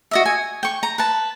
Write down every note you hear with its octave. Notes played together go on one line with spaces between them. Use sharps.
F#4 D#5 E5
G#5
G5 C#6
A#5
B4 A5